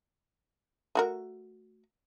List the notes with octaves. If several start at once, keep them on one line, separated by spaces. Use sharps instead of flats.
A3 F#4 A#4